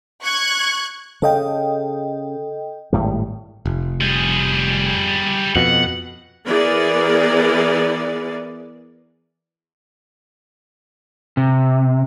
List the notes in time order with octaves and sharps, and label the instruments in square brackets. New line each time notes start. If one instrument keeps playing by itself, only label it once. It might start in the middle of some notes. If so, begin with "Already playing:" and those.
[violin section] C#6 F#6 G#6
[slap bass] C#3 [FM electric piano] A4 D#5 G5
[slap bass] G#1 A2 G3
[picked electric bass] F1
[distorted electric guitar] G3 G#4
[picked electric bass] F2 B2 [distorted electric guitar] F#5
[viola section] E3 B3 G#4 A#4 D5
[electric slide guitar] C3